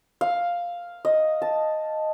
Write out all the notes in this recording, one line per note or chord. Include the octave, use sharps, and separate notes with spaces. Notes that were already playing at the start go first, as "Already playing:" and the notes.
F5
D#5
A5